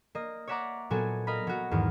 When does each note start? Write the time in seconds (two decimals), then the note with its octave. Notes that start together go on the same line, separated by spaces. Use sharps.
0.15 A#3 D#5
0.48 C#5 D5 E5 F#5 A#5 D6
0.90 A#2 F#3 B3 F#4 A4 G#5
1.27 A#4 D#5 F5 B5
1.47 F#3 F#4
1.71 E2 G#2 D#3